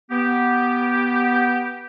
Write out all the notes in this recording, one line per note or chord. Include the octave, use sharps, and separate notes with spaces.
B3 G4